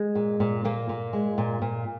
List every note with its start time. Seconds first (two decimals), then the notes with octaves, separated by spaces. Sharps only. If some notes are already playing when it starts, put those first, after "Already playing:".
Already playing: G#3
0.15 A#2
0.40 A#2
0.64 A#2 A#3
0.89 A#2
1.13 G#3
1.38 A#2
1.62 A#2